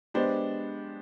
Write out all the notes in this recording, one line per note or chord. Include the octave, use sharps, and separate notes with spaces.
G#3 B3 D4 G4 C5